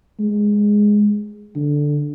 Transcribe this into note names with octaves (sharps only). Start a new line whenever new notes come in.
G#3
D3